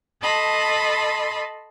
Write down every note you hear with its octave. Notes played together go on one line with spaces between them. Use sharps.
A4 D#5 A5 B5 C6